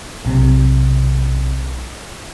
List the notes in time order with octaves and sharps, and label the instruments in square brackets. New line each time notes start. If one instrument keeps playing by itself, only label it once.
[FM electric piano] B1 C3